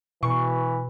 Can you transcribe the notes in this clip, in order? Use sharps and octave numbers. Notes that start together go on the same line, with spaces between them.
B2 E3 C#6